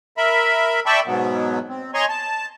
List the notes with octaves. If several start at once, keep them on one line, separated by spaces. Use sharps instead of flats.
A#4 E5 B5
D5 E5 G5 A5 B5 C#6
G#2 B2 F#3 B3
C4
C#5 D#5 G#5 A#5 C6 C#6
A5